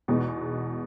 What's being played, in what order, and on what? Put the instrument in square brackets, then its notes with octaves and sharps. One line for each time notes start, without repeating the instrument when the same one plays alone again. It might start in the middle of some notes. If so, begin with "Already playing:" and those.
[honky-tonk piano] E2 B2 G#3 B3 D#4